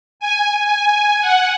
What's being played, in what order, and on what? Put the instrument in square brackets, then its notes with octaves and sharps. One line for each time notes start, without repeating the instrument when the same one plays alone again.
[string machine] G#5
G#5
F#5